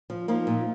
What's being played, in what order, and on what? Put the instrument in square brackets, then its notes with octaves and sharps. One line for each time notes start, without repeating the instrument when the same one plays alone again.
[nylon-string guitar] F3
F3 A#3 D#4
A#2